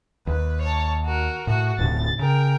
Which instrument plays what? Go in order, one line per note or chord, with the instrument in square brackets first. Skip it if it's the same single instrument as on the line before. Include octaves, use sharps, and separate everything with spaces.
[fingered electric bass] D#2 [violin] B4
[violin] C#5 A5
F#4 A#4
[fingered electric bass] A2 [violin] F#4
[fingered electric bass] D1 A2 C3 [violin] A6
[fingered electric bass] C#3 [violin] A#4 G5